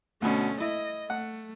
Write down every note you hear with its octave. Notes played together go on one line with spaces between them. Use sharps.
D2 B2 A3 C#4
E4 D#5
A3 F#5